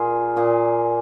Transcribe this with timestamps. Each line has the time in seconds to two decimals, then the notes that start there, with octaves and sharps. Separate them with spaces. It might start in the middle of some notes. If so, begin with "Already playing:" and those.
Already playing: A#2 A#3 F4 G#4
0.36 A#2 A#3 F4 G#4